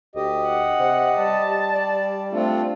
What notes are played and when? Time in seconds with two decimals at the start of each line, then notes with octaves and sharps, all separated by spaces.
0.15 D2 G4 D#5
0.46 F#5
0.80 C3
1.18 G3 A5
1.73 D5
2.32 A3 C4 D4 F4